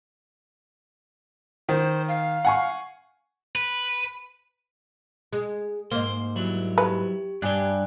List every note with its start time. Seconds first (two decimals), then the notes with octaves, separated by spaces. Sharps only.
1.69 D#3 C5
2.08 F5
2.45 F#5 G#5 C#6
3.56 B4
5.33 G#3
5.91 G#2 A#3 C5
6.36 F#3 G3 E4
6.78 G4 B4
7.42 G2 D4 G4 D5 G#5 F#6